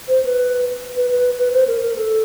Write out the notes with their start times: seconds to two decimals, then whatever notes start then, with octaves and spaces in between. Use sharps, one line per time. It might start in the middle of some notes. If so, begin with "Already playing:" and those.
0.08 C5
0.25 B4
0.96 B4
1.10 B4
1.38 B4
1.53 C5
1.68 A#4
1.82 A#4
1.96 A4